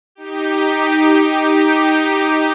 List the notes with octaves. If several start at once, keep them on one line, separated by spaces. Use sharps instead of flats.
D#4 G4